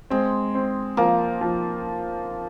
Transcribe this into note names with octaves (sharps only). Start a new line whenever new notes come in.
G#3 C4
C4
F3 A#3
F3